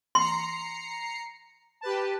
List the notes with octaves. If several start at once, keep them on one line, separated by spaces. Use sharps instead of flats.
A#5 C6 C7 C#7
G4 B4 A5